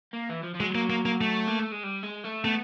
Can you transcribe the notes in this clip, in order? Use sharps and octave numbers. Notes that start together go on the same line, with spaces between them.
A#3
E3
F3
F3
F#3 G#3
A#3
A#3
A#3
A3
A#3
A3
G#3
G3
G#3
A3
A3 B3